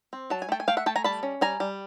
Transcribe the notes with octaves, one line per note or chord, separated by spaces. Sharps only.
C4
F#3 A5
G#5
A3 G5 A5
G#5
A3 F5 G5
E5 F#5
A3 G5 A5
G#5 A#5
G3 A5 B5
C#4
G3 G#5 A#5
G3